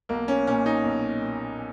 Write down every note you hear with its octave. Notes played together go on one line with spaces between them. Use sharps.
B1 A#3
C#4
A#2 C#4
D#4
B1
A#2